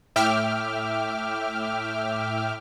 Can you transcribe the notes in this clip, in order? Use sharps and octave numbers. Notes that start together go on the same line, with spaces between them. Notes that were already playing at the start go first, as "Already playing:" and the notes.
A2 E5 G5 D6 F6